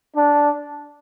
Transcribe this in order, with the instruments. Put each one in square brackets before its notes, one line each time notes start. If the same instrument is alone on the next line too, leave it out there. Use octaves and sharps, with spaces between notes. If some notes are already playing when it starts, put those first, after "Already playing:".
[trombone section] D4